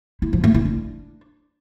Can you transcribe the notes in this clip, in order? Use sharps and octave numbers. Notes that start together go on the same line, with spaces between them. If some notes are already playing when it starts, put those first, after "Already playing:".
E4
F3
A3
E4
D4